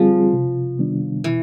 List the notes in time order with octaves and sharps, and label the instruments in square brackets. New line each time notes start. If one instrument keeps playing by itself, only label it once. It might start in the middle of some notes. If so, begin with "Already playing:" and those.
Already playing: [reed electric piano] D3 G3 C4 F4 G#4 [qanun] F3
[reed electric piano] C3
D#3 G3 B3 D4
[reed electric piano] B2 [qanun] E3